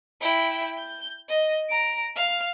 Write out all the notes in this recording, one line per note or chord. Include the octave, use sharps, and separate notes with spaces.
E4 G5
G6
D#5
A#5 D7
F5 F6